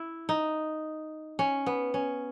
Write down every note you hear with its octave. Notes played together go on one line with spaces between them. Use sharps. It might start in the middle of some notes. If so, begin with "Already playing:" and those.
Already playing: E4
D#4
C#4
B3
C#4